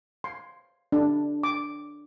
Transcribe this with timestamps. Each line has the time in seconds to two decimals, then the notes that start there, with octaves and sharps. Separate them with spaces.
0.24 C6
0.92 D4
1.43 D6